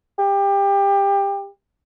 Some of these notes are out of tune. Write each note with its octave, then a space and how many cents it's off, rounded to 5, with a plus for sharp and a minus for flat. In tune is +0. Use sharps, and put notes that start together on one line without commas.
G4 +25